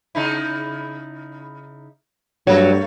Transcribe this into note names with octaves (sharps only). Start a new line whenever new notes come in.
C#3 D#4 E4
G2 F#3 A3 A4 C#5